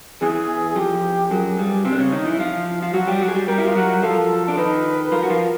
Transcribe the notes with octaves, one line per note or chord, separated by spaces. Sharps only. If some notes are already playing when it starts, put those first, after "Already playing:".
E2 E3 G#4
F2 F3 G4
F#2 F#3 G#4
G2 G3
C3 C4
D4
C#3 C#4
D#3 D#4
E3 E4
F3 F4
F4
F#3 F#4
G3 G4
F#3 F#4
G#4
G3 G4
G3 G4 A#4
E4
F4
F#3 F#4
F3 F4 A4
D4
D#3 D#4 B4
F3 F4 A#4
F#4
F3 F4